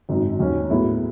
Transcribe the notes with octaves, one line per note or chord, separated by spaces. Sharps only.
G#1 F#2 D#3
D#2 D#3 F#3 C#4
A2 F#3 B3 E4 G#4